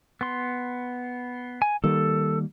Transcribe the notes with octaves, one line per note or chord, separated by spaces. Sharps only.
B3 C6
G#5
D#3 G3 A#3 A4